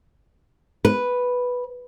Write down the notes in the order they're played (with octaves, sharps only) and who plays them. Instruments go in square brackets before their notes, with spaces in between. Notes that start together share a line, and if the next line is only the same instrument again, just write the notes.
[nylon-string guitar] B4